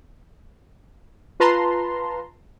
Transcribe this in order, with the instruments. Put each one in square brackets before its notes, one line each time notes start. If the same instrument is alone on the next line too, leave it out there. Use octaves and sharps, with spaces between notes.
[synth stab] F4 B4 A5 A#5 C6